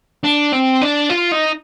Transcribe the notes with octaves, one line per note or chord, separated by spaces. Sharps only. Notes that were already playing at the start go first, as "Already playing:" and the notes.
D4
C4
D4
F4
D#4